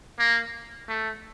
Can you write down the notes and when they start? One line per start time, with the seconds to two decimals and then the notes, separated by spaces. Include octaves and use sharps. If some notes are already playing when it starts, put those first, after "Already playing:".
0.19 A#3
0.89 A3